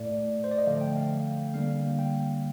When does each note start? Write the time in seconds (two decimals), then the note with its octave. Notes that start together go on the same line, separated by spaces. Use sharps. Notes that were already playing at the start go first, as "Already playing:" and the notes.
Already playing: A2 A3 D5
0.44 C5
0.52 D5
0.58 D#5
0.67 D3 F3 A3 F5
0.81 G5
0.96 F5
1.54 D3 G3 A#3 F5
1.99 G5